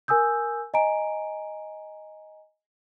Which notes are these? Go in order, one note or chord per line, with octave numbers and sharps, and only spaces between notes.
A#4 G#5 D#6 E6 G6
D#5 G#5 A#5 D7